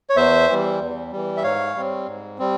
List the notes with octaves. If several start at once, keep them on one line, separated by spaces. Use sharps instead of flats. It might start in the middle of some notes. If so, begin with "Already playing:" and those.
C#5
E2 C5 E5
E3 G3
E2
E3 G3
E5
G#2 C#5 F5
G3 C4
G#2
G3 C4